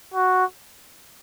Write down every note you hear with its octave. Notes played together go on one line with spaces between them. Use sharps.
F#4